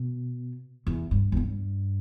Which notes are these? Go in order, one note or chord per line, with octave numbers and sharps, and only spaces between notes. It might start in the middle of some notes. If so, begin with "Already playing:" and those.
Already playing: B2
E2
G2
E2
G2